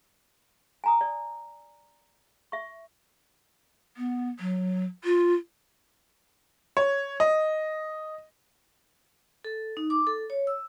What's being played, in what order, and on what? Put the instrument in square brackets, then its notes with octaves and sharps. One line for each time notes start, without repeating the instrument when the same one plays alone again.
[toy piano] G#5 A#5 D#6
D5
E5 C#6
[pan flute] B3
F#3
F4
[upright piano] C#5
D#5
[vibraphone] A4
D#4
D6
A4
C#5
E6